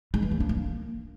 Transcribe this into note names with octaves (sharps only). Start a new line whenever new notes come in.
G#3
E3
A#3
D4
A#3